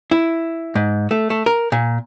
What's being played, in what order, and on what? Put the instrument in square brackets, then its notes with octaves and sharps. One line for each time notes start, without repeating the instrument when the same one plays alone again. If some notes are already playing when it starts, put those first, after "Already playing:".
[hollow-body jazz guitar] E4
G#2
A3
A3
A#4
A#2